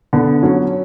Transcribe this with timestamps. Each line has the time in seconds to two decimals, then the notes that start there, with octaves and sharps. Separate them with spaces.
0.13 D3 B3
0.43 F#3 C#4